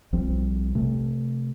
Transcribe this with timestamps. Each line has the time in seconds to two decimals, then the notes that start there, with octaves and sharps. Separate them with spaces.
0.13 B1 F3 G3 C4
0.75 C3 A3